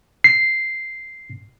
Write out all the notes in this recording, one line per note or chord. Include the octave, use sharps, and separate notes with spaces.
C7